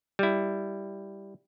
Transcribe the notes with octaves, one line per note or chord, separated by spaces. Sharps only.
G3 E4